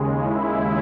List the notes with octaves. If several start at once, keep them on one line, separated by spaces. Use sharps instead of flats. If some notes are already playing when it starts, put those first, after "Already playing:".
Already playing: D#2 C#3 G#3
E4